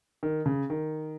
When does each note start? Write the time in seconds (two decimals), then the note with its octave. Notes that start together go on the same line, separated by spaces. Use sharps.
0.23 D#3
0.46 C#3
0.70 D#3